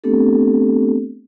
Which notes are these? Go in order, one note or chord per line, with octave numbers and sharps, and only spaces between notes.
A3 B3 C4 D4 G4 A4